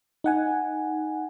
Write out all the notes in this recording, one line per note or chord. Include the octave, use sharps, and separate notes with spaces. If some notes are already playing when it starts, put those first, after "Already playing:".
D#4 F#5 G#5